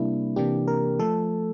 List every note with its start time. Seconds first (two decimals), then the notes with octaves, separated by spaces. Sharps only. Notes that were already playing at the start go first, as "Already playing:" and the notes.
Already playing: C3 G3 A#3 D4 E4
0.36 C3 E3 A#3 D4 G4
0.68 A#4
0.99 F3 A3 A4